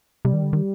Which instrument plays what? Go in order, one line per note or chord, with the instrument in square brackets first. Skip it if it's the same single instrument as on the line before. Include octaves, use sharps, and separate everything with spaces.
[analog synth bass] C3 [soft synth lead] G3
[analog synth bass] D#3
D3
D#3